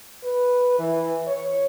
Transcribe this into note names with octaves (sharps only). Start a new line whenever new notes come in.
B4
E3
C#5